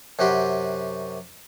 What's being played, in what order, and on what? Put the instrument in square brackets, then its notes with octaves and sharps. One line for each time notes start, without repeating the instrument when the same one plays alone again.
[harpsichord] F#2 C3 F#4 G4 C6